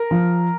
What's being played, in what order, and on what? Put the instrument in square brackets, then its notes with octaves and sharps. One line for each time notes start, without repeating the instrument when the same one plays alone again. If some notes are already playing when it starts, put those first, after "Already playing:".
Already playing: [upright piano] A#4
F3